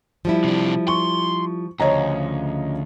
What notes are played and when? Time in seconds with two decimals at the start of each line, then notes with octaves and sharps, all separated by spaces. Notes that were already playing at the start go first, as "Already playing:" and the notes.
0.25 F3 G3 E4
0.44 C3 D4
0.88 C6 C#6
1.80 D2 C#3 F3 C#5 D#5 A#5